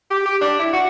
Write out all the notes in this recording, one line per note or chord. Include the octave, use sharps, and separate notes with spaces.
G4
G4
D4
E4
F#4